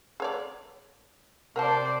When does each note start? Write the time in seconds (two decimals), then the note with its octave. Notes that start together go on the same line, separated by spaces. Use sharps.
0.20 G#4 C#5 D5
1.56 C3 A#4 C5 D5 G5 A5